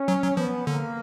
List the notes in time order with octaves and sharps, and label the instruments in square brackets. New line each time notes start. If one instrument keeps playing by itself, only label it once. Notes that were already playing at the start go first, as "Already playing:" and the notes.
Already playing: [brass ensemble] C#4
[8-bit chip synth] F#3
F#3
[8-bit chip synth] F3 [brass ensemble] B3
[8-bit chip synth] D3 [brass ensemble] A#3